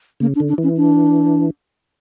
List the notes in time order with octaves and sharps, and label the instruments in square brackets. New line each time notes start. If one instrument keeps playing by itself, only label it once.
[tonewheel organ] C#3 [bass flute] A#3
[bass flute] D4
[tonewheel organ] D3
[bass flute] D4
[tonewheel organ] E3
[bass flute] C#4
D4